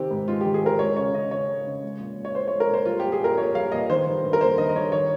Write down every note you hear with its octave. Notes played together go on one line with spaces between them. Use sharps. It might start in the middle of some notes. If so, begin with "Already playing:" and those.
Already playing: C3 D#3 C4 G4
G#2
G#3 F4
D#3 G4
G#4
C4 A#4
G#3 C#5
C#3 C#5
C#3 D#5
C4 C#5
G#3
C#3
G#3
A#2
A#2
C#5
C4 C5
G#3 C#5
A#4
A#2 C5
G3 F4
A#2 G4
G#4
A#2 A#4
A#3 C#5
G3 F5
A#2 D#5
D#3 C5
G2
G2
A#4
A#3 C5
D#3 D#5
D#5
G2 C#5
D#3 C#5